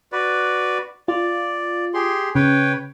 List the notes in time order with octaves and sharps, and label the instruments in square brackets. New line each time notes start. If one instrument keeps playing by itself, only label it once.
[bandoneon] F#4 B4 D5
[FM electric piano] F4 [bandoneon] D5
[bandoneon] G4 G#4 C6
[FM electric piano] C#3 [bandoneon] B4 C#5 G5